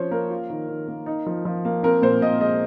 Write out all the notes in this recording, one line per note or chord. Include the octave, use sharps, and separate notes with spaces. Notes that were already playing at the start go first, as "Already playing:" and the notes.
Already playing: F3 C#4 F4 C5 C#5
A#3 A#4
F4
D#3
D#3
A#3
D#4
F3
F3
A#3
C4 A#4
A#2 C5
A#2 D#5
G#3 D#5